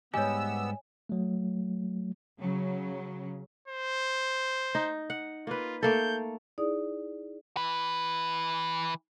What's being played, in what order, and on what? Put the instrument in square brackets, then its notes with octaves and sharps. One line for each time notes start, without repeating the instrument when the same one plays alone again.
[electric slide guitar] G#2 G3 G4 [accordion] B3 E6 [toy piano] C#5 D#5 [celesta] G#5
[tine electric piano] F#3 A3
[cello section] C#3 F#3
[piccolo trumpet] C5
[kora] D#4
F#5
[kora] A#3 B4 [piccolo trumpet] F4
[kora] A3 A#3 A4 [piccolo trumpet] G6
[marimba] D#4 E4 G#4 D5 D#6
[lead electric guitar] E3 B4